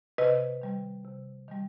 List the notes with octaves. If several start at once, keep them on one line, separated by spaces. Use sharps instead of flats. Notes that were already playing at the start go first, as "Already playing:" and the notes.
C3 B4 D#5
D#3 G3
C3
D#3 G3